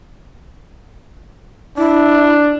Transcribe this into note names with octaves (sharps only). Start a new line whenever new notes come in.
D4 E4